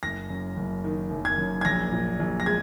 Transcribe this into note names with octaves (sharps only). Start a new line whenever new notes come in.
F#1 A#6
F#2
F#1
D#3
F#1
G#6
F#2
G#6
A#1 A#6
A#2
A#1
A#6
G#3 G#6